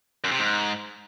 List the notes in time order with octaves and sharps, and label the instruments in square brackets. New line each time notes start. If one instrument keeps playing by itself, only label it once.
[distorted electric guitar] F#2
C3
G#2